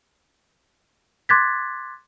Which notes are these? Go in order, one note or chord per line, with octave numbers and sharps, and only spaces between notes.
C6 D6 F#6 G#6 A6 B6